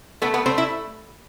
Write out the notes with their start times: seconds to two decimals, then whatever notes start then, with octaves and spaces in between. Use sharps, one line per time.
0.22 A3 B3 B4
0.34 B3 B4
0.46 A3 C4 C5
0.58 E4 E5